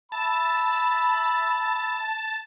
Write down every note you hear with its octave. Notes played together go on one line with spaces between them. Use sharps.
E5 A5 B5